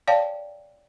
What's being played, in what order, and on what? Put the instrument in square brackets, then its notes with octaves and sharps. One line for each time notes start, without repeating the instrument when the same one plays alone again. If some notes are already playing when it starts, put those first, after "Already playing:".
[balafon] C#5 D5 F5 G5 A5